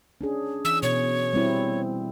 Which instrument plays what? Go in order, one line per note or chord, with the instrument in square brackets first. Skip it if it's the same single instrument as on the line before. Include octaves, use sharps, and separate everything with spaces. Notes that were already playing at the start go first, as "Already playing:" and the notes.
[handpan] C#4 D4 G#4
[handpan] E3 [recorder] E6
[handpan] B2 [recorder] C#5
[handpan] G3 C4 E4